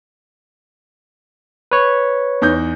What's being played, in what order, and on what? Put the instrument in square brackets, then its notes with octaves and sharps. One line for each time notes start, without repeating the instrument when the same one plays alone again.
[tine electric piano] B4 C#5
[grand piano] E2 D#4 G6